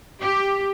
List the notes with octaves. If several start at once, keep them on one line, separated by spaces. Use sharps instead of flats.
G4